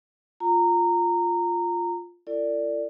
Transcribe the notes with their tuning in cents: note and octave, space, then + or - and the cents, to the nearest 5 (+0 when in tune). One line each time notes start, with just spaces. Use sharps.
F4 +0 A#5 -15
E4 +45 A4 +35 D5 +0